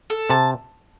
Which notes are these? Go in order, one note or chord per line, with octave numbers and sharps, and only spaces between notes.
A4
C3 A5